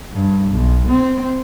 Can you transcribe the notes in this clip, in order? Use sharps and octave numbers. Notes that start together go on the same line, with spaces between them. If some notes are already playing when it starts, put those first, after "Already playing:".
G2
B1
C4